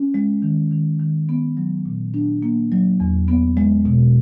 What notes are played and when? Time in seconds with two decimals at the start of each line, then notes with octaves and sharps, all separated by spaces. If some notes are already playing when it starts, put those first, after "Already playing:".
Already playing: C#4
0.14 G#3
0.42 D#3
0.71 D#3
1.00 D#3
1.29 B3
1.57 F#3
1.86 A#2
2.14 D4
2.42 A#3
2.72 F#3
3.00 E2
3.28 B3
3.57 G#3
3.85 B2